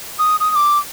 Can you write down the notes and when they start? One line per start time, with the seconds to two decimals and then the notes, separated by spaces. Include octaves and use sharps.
0.19 D#6
0.40 D#6
0.51 D#6
0.56 D6